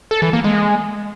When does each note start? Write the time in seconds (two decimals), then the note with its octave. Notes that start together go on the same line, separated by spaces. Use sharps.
0.11 A4
0.22 E3
0.33 A#3
0.44 G#3